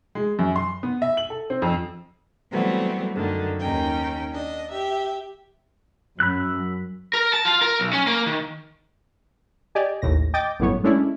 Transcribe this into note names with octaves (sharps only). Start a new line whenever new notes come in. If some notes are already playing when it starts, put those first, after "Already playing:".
G#3
F#2
C6
B3
E5
F#7
A4
C4
F2
E3 F#3 G3 A3 B3 C4
F#2 D3 D#3
D#2 C#4 D#4 G5
D4 D#5
G4 E5
F#2 B5 E6 F#6
A#4
A5
F4
A#4
B1
C#4
A#3
D#3
G4 D5 D#5 G#5
A1 D#2 A2 A#6
D#5 G5 D6 G6 A6
G1 F#2 A2 B3 C#5
G#3 A3 C#4 D4 E4